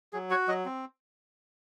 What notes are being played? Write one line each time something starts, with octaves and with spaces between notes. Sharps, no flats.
F#3 G#4
F#4 C#5
F#3 D#5
C4